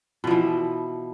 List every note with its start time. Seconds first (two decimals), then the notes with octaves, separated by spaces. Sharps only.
0.24 B2
0.27 F3
0.31 E3